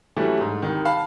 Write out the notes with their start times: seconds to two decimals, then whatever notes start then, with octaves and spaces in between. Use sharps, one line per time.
0.17 E3 F#3 G3 A3 C#4 D4
0.41 G#2
0.62 C2 D#3
0.85 F5 A5 B5